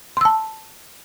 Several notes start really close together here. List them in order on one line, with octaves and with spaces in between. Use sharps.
C6 E6 A5